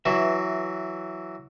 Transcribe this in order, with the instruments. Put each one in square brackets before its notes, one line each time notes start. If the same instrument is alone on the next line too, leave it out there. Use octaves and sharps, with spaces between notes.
[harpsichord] E3 F#3 [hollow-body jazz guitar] B4 E5